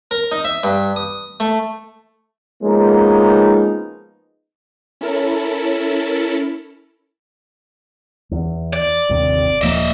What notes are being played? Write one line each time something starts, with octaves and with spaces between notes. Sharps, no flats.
A#4
D#4
E5
G2
D#6
A3
F3 G#3 A#3 B3 C#4 D#4
C#4 E4 A4 A#4 A5 B5
E2
D5
G1 D#2 C3
D#1 F3 A#3 D#5 E5